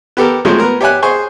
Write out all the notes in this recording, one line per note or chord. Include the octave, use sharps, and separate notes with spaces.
B3 G4 A4 A#4
F3 F#3 G#3 A3 C4
B3 A#4
G4 C#5 E5 G#5 F#6
G#4 C5 G#5 C#6